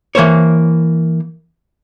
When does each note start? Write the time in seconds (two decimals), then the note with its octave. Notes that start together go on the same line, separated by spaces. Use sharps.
0.15 E3 A#3 C5 C#5